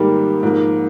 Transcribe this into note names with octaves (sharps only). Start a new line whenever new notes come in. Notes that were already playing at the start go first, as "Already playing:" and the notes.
Already playing: G#2 D#3 G3 A#3 G4
G#2 F3 A#3